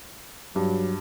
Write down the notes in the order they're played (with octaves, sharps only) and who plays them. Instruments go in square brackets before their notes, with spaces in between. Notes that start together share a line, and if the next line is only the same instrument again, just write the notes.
[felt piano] G2 [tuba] F#3